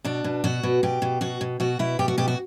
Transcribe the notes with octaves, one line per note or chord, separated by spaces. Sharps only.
B2 D4
B2
B2 F#4
B2
B2 G4
B2
B2 F#4
B2
B2 F#4
B2 E4
B2 G4
F#4
B2 G4
F#4